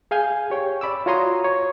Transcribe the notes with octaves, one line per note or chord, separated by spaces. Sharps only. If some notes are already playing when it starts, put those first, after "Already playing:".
G#4 F5 G#5 G6
G4 C#5 G5
D5 B5 D6 E6
F4 F#4 C#5 A#5 C6 D#6
C#5